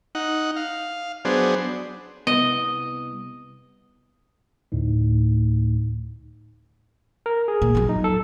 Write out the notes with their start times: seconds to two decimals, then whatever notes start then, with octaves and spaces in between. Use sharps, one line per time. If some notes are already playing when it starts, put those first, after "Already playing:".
0.15 D#4 F#5
0.56 F5
1.25 F#3 B3 D4 G#4 C5
2.27 C2 B3 D#5
4.72 D2 A2 D#4
7.26 A#4
7.48 G#4
7.62 A#2
7.75 F2 F#3
7.89 D#4
8.04 A4